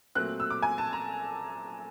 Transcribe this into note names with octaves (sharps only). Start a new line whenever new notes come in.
A#2 F#3 A3 C4 F#6
E6
D6
G#5
A5
A#5